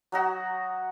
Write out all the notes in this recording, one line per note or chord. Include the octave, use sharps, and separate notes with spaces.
F#3 D#4 F#4